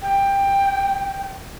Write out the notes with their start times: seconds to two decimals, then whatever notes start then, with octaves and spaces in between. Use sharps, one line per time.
0.01 G5